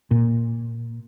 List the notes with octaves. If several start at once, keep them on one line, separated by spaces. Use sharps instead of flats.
A#2